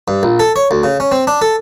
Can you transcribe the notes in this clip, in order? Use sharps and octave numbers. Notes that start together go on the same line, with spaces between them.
G2
A#1
A4
C#5
D2
C#3
C#4
C4
D4
A4